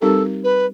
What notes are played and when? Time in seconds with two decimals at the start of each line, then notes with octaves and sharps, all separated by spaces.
0.01 G3 C4 D#4 G4 A4 A#4
0.44 B4